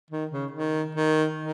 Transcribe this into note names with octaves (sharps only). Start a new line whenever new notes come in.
D#3
C#3
D#3
D#3
D#3